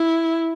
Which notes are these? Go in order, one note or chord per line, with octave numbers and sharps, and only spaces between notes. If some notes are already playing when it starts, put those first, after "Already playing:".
Already playing: E4